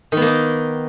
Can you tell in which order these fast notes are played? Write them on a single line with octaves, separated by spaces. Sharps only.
D#3 B3 A#3 D#4